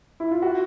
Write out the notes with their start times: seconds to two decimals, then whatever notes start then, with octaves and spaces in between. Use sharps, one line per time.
0.20 E4
0.31 F4
0.42 F#4